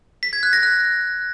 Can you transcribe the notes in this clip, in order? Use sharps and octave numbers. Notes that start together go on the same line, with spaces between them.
B6
G#6
F#6
A#6
F#6